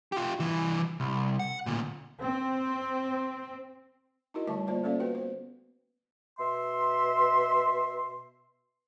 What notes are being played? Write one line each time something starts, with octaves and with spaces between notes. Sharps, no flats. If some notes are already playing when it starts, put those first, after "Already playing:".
F4 G4
C2 E3
C2
F#5
D2 A#2
C4
D#4 E4 F#4 A#4 D#5
D3 G3 A3 E5 A5 C#6
A#3 F4 C5 D5 A5
A#3 C#4 A4 C5 D5 F5
B3 F#4 B4 G5
C5
B2 E5 C6